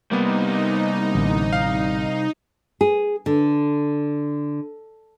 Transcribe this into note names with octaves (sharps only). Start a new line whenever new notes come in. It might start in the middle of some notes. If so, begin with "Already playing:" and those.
C3 G3 A#3 B3 D#4
A1 D3
F5
G#4
D3